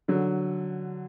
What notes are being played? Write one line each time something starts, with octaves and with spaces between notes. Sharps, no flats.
D3 F#3